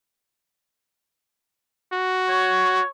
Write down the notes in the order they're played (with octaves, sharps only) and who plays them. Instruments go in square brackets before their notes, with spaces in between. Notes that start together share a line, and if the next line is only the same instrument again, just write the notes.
[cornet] F#4
[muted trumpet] C#5